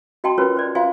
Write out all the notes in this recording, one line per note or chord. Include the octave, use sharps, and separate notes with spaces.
F#4 D#5 G5 A5 C6
C#4 F4 F#4 A#4 B4 C#5
C5 D5
F4 C5 E5 F5 G#5 C6